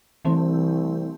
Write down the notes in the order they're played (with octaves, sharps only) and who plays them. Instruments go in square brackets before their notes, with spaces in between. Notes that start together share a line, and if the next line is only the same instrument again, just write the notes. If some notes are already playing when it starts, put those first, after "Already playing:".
[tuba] C2 [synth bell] E3 A3 C4